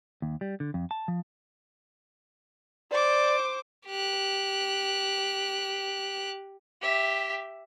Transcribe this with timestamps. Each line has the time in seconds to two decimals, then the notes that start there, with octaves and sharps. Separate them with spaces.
0.22 D#2
0.41 G3
0.60 D3
0.74 F2
0.91 A5
1.08 F3
2.91 C5 D5 D6
3.86 G4 F#6
6.81 G4 E5